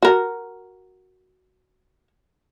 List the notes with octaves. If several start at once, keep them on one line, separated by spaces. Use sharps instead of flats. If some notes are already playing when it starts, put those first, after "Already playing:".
F#4 A#4